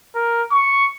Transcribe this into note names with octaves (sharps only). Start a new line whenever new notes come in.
A#4
C#6